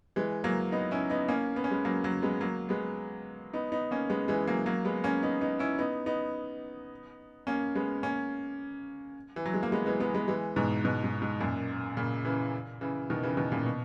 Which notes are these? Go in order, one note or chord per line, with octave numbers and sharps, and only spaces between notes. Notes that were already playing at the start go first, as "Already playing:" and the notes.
E3 G#3
F#3 A#3
B3 D#4
C#4 E4
B3 D#4
A#3 C#4
B3
C#4
G#3 B3
F#3 A#3
F#3 A#3
G#3 B3
F#3 A#3
G#3 B3
B3 D#4
B3 D#4
A#3 C#4
G#3 B3
E3 G#3
F#3 A#3
F#3 A#3
G#3 B3
A#3 C#4
B3 D#4
B3 D#4
C#4 E4
B3 D#4
B3 D#4
A#3 C#4
G#3 B3
A#3 C#4
E3
F#3
G#3
A#3
G#3 B3
E3 G#3
G#3 B3
G#3 B3
E3 G#3
G#2 B2
G#2 B2
G#2
G#2
F#2 A#2
A#2 C#3
C#3 E3
C#3 E3
B2 D#3
C#3 E3
B2 D#3
A#2 C#3
B2